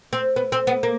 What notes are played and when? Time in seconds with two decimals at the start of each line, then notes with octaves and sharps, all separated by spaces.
0.13 C4
0.36 B3
0.52 C4
0.67 B3
0.83 A#3